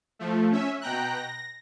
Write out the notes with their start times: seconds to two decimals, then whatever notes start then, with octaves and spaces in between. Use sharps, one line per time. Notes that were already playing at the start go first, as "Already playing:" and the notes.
0.19 F3 A3
0.52 C#4 E5
0.81 B2 G5 A#5 F#6
1.14 A#6